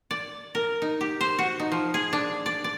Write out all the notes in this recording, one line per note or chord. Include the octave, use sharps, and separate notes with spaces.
D5
A#4
D#4
G4
C5
F#4
D#4
F3
G#4
D4
D5
D5